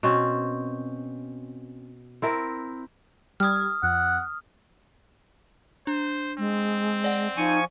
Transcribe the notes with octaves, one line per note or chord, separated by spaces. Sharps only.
B2 C4 C#4
C4 E4 A#4
G3 D#6 F6 G#6
F2 F#5
D4 C5
G#3 C4
D5 F#5
F3 D#4 G#5 C#6